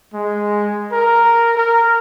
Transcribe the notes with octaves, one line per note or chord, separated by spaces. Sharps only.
G#3
A#4
A#4